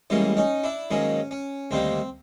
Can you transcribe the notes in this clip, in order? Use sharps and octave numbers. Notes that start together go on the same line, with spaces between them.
A1 G#2 E3 G3 A#3 C#4
C#4 D#4
D4 E4
G#2 D#3 F#3 A#3 C#4
C#4
D2 C3 D#3 G3 A#3 C4